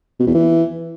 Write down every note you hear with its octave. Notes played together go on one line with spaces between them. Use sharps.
B2
E2
E3